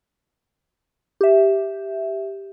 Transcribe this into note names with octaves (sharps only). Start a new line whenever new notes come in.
G4 E5